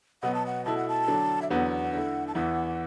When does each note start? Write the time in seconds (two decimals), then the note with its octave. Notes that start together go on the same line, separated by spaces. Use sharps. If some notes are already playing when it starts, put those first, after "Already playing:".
0.23 B2 F#3 B3 F#5
0.34 A5
0.46 F#5
0.65 B2 A3 E4 A5
0.77 F#5
0.89 A5
1.08 D3 F#3 D4
1.42 E5
1.51 E2 D3 F#3 B3 F#5
1.93 D3 A3 E4
2.28 A5
2.35 E2 E3 B3 E4 F#5